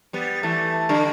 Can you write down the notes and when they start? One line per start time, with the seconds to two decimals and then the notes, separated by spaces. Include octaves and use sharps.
0.13 G3 B3
0.43 E3 A3
0.89 D3 G3